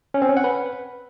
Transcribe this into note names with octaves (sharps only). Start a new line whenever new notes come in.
C#4
C4
C#4
F#5
B4